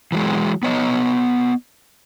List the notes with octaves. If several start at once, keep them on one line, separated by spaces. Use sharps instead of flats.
E3 F#3 G#3
B3 C#5 D#5